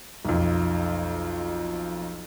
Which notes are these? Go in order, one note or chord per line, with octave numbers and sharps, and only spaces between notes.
B1 F2